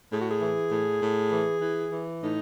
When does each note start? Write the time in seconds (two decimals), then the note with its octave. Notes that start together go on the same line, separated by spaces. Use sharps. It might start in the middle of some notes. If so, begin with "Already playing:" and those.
0.11 A2 G#4
0.21 F#4
0.30 G#4
0.41 E3
0.71 A2
1.01 A2
1.31 E3
1.61 E3
1.92 E3
2.22 A2 D#4